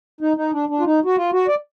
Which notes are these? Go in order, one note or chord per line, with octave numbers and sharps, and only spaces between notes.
D#4
D#4
D4
D4
F4
D#4
F#4
F4
F#4
D5